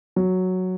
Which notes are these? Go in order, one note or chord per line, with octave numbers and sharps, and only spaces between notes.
F#3